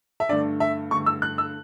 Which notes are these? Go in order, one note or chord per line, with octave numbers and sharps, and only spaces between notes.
E5
G2 D3 A3 D5
E5
G2 D3 A3 C#6
E6
F#6
E6